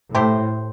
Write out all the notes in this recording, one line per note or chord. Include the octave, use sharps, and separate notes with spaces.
A2 A3 E4 G4 C5